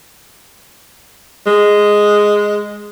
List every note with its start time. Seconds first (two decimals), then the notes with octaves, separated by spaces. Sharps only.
1.46 G#3